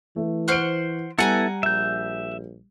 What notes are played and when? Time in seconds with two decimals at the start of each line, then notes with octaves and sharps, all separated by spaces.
0.16 E3 A3
0.48 C5 F#5 C#6 F6 D7
1.19 G3 B3 E4 A4 F#5 G#5 A#5
1.63 A#1 E5 G6